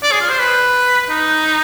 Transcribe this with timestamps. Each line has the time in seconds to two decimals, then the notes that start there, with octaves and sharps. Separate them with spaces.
0.03 D5
0.12 G#4
0.21 F4
0.30 C5
0.39 B4
1.10 D#4